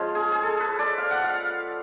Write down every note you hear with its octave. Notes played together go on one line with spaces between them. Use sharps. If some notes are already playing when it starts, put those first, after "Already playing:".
Already playing: F3 G#3 C#4 F4
G#4
G#4
A4
B4
D5
F5
F#5
F5